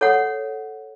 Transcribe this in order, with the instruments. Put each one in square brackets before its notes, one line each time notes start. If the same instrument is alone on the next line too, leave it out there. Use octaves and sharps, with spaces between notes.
[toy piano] A4 C#5 F#5